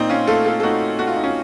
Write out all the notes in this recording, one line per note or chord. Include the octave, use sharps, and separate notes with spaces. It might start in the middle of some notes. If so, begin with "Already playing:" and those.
Already playing: A#2 C4 D#4
C#4 F4
A3 F4 A4
F4 A4
A4
A3 D#4 F#4
A3 F#4
F4
D#4
C#4 F4